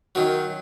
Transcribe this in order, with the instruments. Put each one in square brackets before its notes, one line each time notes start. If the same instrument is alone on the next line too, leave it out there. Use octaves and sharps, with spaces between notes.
[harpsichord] F#2 D#3 F#3